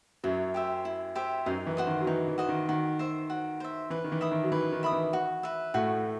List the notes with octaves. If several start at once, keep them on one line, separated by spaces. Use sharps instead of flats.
F#2 F#3 E4
G4 C5 E5
E4
G4 C5 E5
F#2 F#3 D#4
E3
F#4 C5 D#5
D#3
F#3
E3 D#4
E3
F#4 C5 D#5
D#3
D#3 F#4
C5 E5
F#4
C5 E5
E3 B4
D#3
E3
E5 B5 D#6
D#3
F#3
E3 B4
D#3
E5 B5 D#6
E3
F#4
B4 E5
A2 A3 F#4